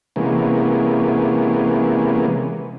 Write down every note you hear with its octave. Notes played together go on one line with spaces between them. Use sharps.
C3 E3 G#3 A#3 B3 C#4